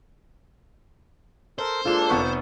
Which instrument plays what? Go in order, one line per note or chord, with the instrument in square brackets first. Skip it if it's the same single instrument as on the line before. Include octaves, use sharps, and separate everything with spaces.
[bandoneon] A4 A#4 [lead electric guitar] C5
[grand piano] G#3 E7 [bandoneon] A#3 D4 A4 [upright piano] F4
[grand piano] F1 B3 C#6